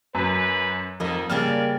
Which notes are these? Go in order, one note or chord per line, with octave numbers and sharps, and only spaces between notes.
F#2 B4 B6
F2 D#3 A#3 D#5
C#3 G3 A#3 D5 A5 F6